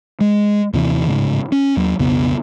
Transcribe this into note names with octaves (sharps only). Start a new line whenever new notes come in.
G#3
D#2 C3 E3
D1 C2 G#2 C#3
C#4
D#2 F#3
B1 F2 C#3 B3